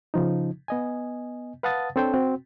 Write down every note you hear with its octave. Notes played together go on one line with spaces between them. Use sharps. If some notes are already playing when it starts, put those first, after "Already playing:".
C#3 F3 D#4
B3 D#5 G#5
B4 F5 F#5 A5 D#6 A6
C4 D4 A4 C5 C#5 G5
C4 F#4